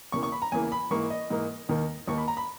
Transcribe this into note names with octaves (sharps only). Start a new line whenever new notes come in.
E2 C#3 E3 A#3 C#6
C#6
B5
A#5
E2 C#3 E3 A#3 G#5
B5
G#2 E3 A#3 C#6
D#5
G#2 E3 A#3
D#2 D#3 A#3
D#2 D#3 A#3 C#6
B5
A#5
B5